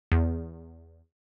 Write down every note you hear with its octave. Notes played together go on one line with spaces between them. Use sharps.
E2